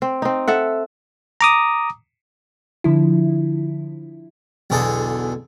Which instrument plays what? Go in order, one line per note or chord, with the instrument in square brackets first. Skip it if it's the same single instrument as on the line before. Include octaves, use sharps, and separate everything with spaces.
[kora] C4
C4 D#4
A4 E5 F#5
[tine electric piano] A#5 D6 D#6
[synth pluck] D3 F3 E4
[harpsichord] B1 E2 D3 G#4 A4